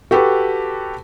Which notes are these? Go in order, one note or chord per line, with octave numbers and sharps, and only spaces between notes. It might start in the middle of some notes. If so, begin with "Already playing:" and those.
F#4 G4 A4 B4